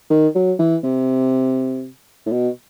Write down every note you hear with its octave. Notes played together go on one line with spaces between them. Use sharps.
D#3
F#3
E3
C3
A2
B2